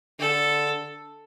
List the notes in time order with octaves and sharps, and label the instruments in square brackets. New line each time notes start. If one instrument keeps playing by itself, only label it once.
[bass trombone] D3 [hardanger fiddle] A4